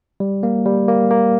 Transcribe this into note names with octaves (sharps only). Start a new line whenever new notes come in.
G3
A#3
G3
A#3
A#3